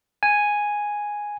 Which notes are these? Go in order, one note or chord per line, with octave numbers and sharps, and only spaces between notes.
G#5